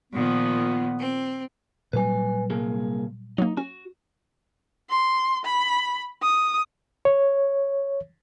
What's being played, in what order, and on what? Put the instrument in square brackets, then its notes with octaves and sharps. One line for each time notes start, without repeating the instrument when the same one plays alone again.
[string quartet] A#2 D#3 F3 [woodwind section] B3
[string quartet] C4
[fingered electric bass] A#2 F#3 G3 [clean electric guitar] B4 G#5
[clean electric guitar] C2 A#3 G#4
[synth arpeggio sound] F#3 A#3 [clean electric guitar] D#4
[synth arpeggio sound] C#4 [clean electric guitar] F#4
[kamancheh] C6
B5
D#6
[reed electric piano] C#5